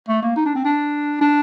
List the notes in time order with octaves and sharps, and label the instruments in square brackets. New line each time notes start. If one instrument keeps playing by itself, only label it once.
[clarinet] A3
A#3
D#4
D4
C4
D4
D4